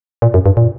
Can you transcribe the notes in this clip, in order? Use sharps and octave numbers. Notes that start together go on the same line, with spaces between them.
A#2
F#2
G2
A#2